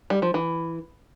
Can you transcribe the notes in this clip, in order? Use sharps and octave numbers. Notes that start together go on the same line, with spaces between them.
G3
F3
E3